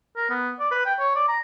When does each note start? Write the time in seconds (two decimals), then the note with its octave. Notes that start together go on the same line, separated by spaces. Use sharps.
0.17 A#4
0.30 B3
0.60 D5
0.71 B4
0.86 G5
0.99 C#5
1.16 D5
1.28 A#5